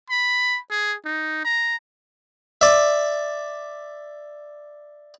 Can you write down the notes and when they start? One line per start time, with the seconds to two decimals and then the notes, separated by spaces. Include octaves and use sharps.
0.10 B5
0.70 G#4
1.05 D#4
1.45 A#5
2.61 D5 E5